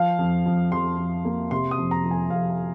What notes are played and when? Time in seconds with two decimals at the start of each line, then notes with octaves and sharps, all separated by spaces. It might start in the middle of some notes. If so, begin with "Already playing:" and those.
Already playing: F3 F5
0.19 F2
0.45 F2
0.72 F2 C6
0.98 F2
1.25 A#3
1.51 C3 C6
1.71 D#6
1.78 F2
1.91 A#5
2.04 F2
2.11 G#5
2.30 F2 F5